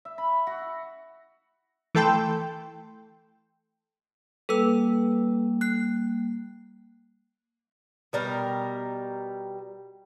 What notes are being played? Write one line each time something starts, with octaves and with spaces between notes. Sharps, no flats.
E5
B5
F#4
E3 A3 A4 G5 C6
G3 A#3 A4 B4 E6
F#6 C7
B2 G3 A#4